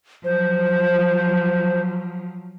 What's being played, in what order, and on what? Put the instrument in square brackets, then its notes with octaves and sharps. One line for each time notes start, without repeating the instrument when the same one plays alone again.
[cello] F3 F#3 [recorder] C5